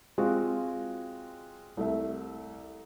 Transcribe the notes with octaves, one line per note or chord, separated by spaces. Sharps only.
G#3 C4 F4 F#4
C2 A3 E5